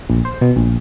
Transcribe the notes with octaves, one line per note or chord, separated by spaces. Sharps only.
A#1
C5
B2
A#1